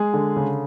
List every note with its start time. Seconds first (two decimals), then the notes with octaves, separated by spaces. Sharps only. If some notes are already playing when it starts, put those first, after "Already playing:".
Already playing: G#3 G#4
0.14 D3
0.36 C#3